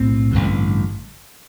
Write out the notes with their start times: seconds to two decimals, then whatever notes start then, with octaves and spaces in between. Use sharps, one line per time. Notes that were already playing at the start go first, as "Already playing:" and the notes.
Already playing: B1 A2 C4
0.32 A1 G2 D3